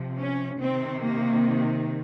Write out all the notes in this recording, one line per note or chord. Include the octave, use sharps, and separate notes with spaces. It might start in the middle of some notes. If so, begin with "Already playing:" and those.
Already playing: C3 F3
C#4
C3 D#3 C4
A#3